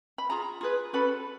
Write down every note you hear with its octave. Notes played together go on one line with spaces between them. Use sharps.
B5
F4 G#4 A#5
F4 G#4 B4
C#4 F#4 A4 B4 B5